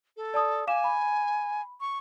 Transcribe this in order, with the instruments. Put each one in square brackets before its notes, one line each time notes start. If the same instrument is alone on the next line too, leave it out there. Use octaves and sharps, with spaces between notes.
[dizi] A4
[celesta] D5 A5 D#6
[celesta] F5 D6 E7 [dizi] G#5
[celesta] B5
[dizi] C#6